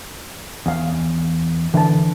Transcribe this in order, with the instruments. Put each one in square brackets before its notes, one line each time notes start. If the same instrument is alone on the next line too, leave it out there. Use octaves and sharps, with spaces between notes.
[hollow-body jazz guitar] E2 F5
[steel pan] D3 [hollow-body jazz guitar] E3 A5